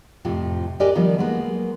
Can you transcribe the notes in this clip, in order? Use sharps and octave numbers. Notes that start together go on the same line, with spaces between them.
F2 A2 C3 F3
G4 A#4 B4 D5 D#5 G#5
D#3 F3 G3 B3
F#3 G#3 A#3 B3 A#4